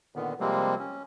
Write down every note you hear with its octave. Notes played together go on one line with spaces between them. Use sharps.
A#2 D3 D#3 B3
C3 F3 G3 G#3 A#3 C4
C#4